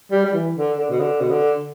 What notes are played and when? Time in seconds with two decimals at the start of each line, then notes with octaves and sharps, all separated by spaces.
0.11 G3
0.25 G3
0.34 E3
0.56 D3
0.78 D3
0.90 B2
1.00 D3
1.20 B2
1.31 D3